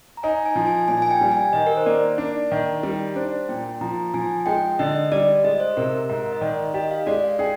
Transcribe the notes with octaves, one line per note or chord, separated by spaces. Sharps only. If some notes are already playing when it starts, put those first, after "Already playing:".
A#5
D#4 G#5
G#5
F3
G#5
A#2 G#5
G#5
G5
G3
G#5
D#3 D#5
A#4
C5
A#3 D5
D4
D#3
G3
D4 C5
A#2 G5
F3 A#5
F3 G#5
G#3 G5
D3 D#5
G3 D5
G#3 D#5
C5
C3 A#4
G#2 A#4
D#5
D#3 D5
G4 D#5
F5
G#3 D5
F5
G#4 G5